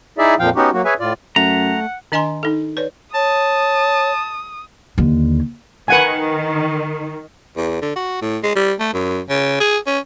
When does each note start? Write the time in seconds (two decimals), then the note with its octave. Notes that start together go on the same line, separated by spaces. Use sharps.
0.18 D#4 E4 G#4 D5 E5
0.39 F2 A#2 F3 F5 G5
0.56 B3 C#4 D#4 F#4 G4
0.73 F#3 A#3 F#4
0.85 G#4 B4 C#5 E5 G#5
1.00 A2 F4 D5
1.36 F#2 A3 F#5 A#5
2.12 D#3 D4 D#5 G#5 A#5 C6
2.43 D#4 A4
2.77 B4 C#5 D5
3.14 C#5 A5 D#6
4.98 D#2 D3
5.88 D#3 B4 F#5 G#5
7.57 E2
7.82 D3
7.96 F#4
8.22 A2
8.43 G#3
8.55 G3
8.80 A3
8.93 F#2
9.29 C#3
9.60 G#4
9.87 C#4